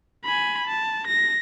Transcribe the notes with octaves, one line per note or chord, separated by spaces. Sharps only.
G#5 B5
A5
A#6